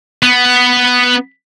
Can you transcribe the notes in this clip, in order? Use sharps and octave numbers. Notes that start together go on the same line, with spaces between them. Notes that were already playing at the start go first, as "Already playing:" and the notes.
B3